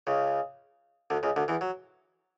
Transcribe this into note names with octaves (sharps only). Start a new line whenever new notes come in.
C#2 C#3
D2 D3
C#2 C#3
D2 D3
E2 E3
F#3